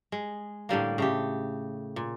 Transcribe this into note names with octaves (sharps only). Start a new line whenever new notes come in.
G#3
A2 D3 G3 A#3
C#3 A3 G4
A#2